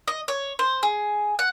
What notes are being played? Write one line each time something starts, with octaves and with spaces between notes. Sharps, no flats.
D#5
C#5
C5
G#4
F#5